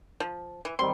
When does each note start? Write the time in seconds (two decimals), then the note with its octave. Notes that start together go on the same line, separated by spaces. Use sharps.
0.20 F3
0.65 E3
0.79 D#3 G3 C4 C6